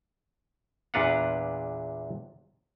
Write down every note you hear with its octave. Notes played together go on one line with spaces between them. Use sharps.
E2 A#2 D4 B4 F5 F#5